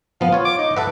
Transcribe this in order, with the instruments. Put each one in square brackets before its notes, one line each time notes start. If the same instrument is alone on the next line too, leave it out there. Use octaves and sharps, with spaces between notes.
[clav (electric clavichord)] F3 B3 [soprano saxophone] F5
[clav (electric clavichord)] F4 C#5
[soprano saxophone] D6
D#4
[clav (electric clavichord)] A4 E5 F#5 [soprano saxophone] B4